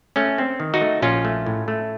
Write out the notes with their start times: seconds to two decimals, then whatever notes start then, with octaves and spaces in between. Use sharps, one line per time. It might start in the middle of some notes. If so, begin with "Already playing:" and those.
0.16 A3 C#4
0.38 C4
0.60 D#3
0.74 D#4 F#4
0.81 A3
1.02 A#1 C#4 F4
1.25 A3
1.46 A2
1.68 A3